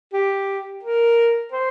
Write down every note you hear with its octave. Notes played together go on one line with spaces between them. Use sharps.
G4
A#4
C5